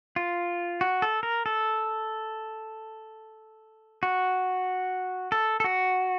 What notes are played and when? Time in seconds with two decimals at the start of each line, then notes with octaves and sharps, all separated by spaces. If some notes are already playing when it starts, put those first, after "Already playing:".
0.16 F4
0.81 F#4
1.02 A4
1.23 A#4
1.46 A4
4.03 F#4
5.32 A4
5.60 A4
5.64 F#4